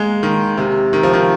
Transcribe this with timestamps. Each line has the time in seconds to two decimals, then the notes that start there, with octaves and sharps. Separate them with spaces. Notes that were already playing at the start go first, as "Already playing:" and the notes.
Already playing: G#3 A#3
0.23 D#3
0.57 C3
0.93 D#3
1.03 F3
1.13 D#3